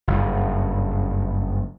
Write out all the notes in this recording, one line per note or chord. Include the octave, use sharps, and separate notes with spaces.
F#1 G2